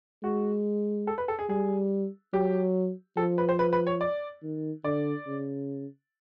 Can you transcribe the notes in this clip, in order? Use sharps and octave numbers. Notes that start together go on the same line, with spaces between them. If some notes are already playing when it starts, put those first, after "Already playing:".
G#3 F#4
A4
B4
A4
G#4
G3 G#4
F#3 G4
F3 A4
B4
C5
B4
B4
C#5
D5
D#3
D3 D5
C#3